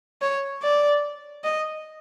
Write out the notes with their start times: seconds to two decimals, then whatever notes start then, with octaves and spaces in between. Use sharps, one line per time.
0.22 C#5
0.62 D5
1.44 D#5